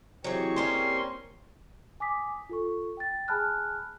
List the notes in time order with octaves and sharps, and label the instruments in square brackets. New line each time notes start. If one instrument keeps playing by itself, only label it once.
[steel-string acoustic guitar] E3 F#3 [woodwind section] G#3 C5 C#5 [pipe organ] C4 G4 C#6
[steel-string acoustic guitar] G3 A#3 C#4 [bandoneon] C6
[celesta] G#5 D6 D#6 B6
F4 A4 C#6
G5 A6
G#4 G#5 A5 B5 F6 F#6